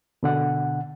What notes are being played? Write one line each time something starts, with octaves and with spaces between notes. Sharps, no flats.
B2 D3 F#5